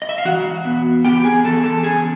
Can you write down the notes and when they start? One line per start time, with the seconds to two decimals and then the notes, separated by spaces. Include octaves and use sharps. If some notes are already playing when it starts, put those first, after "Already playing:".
0.02 D#5
0.09 E5
0.18 F5
0.25 E3 F#4 F#5
0.65 B3
1.05 B3 G4 G5
1.24 G#4 G#5
1.44 E3 A4 A5
1.64 A4 A5
1.83 C#4 G#4 G#5